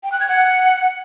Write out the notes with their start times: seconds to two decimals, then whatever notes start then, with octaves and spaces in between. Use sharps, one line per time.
0.03 G5
0.12 F#6
0.20 G#6
0.29 F#5